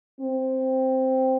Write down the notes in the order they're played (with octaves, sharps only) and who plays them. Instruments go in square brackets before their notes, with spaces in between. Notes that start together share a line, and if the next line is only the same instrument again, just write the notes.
[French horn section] C4